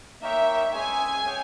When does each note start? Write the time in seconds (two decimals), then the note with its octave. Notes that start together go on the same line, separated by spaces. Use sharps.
0.22 A#3 D#4 A#4 C#5 E5 G5
0.73 G#3 C#4 G#4 C#5 E5 G#5
1.25 C#4 G#4 C#5 G5